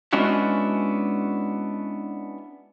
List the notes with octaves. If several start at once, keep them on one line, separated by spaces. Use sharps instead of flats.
G#3 B3 C#4 D4 E4 F#4